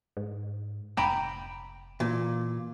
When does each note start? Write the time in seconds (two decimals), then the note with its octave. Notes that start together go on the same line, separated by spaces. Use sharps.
0.17 G#2
0.97 F1 G5 A#5 B5
2.00 A#2 E3